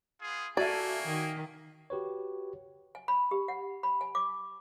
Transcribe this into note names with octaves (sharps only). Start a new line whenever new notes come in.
B3 F4 G#4
A#3 F#4 A4 D5 E5 G#5
D#3
F#4 G4 B4 C#5
G#5
B5
G4
F#5
B5
G#5
D6